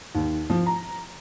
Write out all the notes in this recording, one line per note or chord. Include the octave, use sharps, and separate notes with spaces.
D#2
F3
A#5